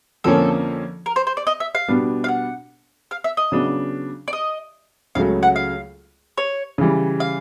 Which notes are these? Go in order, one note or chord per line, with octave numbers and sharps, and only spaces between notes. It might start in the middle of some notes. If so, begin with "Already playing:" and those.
F2 D3 F3 A#3 C#4 A4
A#4
C5
C5
D5
D#5
E5
F5
B2 G3 B3 D4
F5
F#5
F5
E5
D#5
C#3 F#3 B3 D4
D5
D#5
C#2 C#3 F#3 A3 F5
F#5
F5
C#5
C#3 E3 G3
F5